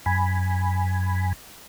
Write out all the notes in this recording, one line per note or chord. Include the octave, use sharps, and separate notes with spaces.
F#2 G#5 B5